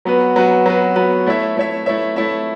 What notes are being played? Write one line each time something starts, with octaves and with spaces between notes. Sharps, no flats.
F#3 B3 F#4 B4
F#3 B3 F#4 B4
F#3 B3 F#4 B4
F#3 B3 F#4 B4
A3 E4 C#5 E5
A3 E4 C#5 E5
A3 E4 C#5 E5
A3 E4 C#5 E5